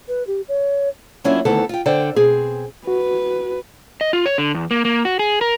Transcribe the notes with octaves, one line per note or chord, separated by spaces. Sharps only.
B4
G4
C#5
F#3 A#3 C#4 D4 E4 F4
D2 D#3 E3 B3 C4 A4
F4 G5
D3 C5 D5 G5
B2 C4 G#4
F#4 B4
D#5
F4
C#5
D3
E2
A#3
A#3
F#4
G#4
A#4